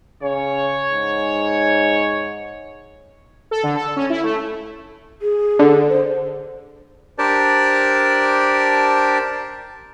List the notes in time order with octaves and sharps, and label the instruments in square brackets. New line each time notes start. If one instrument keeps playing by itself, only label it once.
[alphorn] C#3 [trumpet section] C#5
[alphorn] G#2
[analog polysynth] A4
D3
A4
C#4
E4
A3
[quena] G#4
[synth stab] D3
[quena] C5
[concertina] D4 G4 A#4 C5 D5 A5